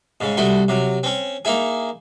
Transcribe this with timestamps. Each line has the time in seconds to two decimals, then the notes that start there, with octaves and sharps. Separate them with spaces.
0.21 G#2 C#3
0.37 C2 A3 F#4 C6
0.68 C3 F#3
1.03 C4 C#4
1.45 A#3 D#4 E4 G#4